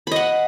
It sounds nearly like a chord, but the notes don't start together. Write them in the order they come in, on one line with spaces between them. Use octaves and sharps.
B5 D#5 F#5